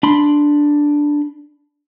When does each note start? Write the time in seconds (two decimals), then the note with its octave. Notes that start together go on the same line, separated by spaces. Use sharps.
0.03 D4 B5 C6